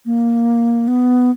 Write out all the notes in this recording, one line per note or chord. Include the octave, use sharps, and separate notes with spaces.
A#3
B3